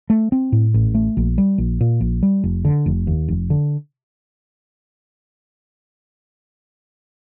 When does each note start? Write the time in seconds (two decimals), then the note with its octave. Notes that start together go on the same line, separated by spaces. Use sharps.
0.10 A3
0.32 C4
0.52 A2
0.74 A1
0.95 A3
1.17 A#1
1.38 G3
1.58 A#1
1.81 A#2
2.01 A#1
2.23 G3
2.44 F1
2.65 D3
2.86 F1
3.07 D#2
3.28 F1
3.50 D3